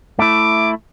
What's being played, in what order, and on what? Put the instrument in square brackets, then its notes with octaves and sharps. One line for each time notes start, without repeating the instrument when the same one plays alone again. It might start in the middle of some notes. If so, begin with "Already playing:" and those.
[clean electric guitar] A3 E4 [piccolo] D6